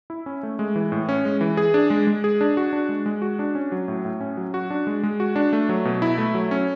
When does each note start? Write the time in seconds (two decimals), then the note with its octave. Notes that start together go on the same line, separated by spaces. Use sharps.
0.10 E4
0.26 C#4
0.43 A3
0.59 G#3
0.76 E3
0.92 A2
1.09 C#4
1.25 G#3
1.41 E3
1.57 G#4
1.74 D4
1.90 G#3
2.07 G#3
2.24 G#4
2.41 D4
2.57 F#4
2.73 D4
2.89 G#3
3.06 G#3
3.22 F#4
3.39 D4
3.55 C#4
3.72 F#3
3.88 A2
4.05 A2
4.21 C#4
4.37 F#3
4.54 F#4
4.70 D4
4.87 G#3
5.03 G#3
5.20 F#4
5.36 D4
5.53 A3
5.69 F#3
5.85 B2
6.02 E4
6.18 A3
6.34 F#3
6.51 C#4